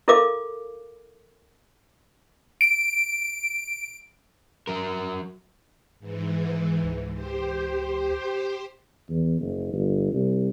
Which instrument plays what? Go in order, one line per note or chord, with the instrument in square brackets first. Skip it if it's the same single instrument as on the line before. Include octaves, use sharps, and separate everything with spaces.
[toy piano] E4 A4 A#4 F5 D6
[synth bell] D7
[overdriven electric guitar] F#3 A#4
[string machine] G#2 E3
[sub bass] C#2
[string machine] G4 C5
[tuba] E2
F#1
G1
C2